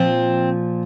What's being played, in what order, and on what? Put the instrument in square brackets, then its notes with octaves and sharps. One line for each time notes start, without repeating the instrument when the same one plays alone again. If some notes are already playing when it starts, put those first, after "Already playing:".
Already playing: [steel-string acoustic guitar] A#2 F3 C4